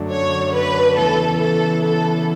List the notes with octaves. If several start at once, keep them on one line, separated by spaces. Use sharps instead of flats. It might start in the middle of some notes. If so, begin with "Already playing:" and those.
Already playing: F#2 D3 F#3 A3 D4
C#5
B4
E2 C#3 E3 B3 E4 A4
A4
A4